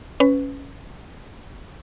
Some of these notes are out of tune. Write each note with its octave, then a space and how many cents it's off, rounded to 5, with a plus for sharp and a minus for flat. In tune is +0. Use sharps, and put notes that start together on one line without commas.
C#4 +0 B4 +20